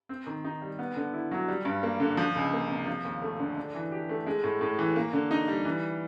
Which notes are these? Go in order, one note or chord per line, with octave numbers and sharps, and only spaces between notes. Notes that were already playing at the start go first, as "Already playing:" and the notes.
C4
D#3
D#4
G3
B3
D3
E4
F#3
G3
G2
A#3
D3
F3
C#2
A#3
C3
F3
D#2
A3
D3
D4
E3
G4
A3
G#3
A2
A2
E3
A#3
D3
D#4
G3
E3